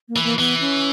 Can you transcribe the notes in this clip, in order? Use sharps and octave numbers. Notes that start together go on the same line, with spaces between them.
A#3
E3
A#3
E3 B3
C#4